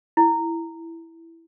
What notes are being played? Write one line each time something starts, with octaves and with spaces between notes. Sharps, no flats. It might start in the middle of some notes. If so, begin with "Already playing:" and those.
E4